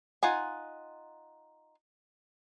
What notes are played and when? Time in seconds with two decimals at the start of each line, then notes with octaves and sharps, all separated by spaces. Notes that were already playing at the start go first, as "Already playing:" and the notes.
0.23 D#4 F4 F#5 G#5